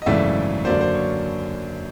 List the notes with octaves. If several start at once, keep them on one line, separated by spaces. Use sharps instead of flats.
D#5
G#1 F#2 C#3 E3 A3 D5 E5
F#2 D3 F#3 A#3 C5 D5
C5
C#5